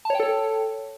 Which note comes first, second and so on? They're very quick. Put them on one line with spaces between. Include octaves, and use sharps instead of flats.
A5 C#5 G5 A4